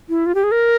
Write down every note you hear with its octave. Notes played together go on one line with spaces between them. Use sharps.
E4
F4
G4
G#4
A#4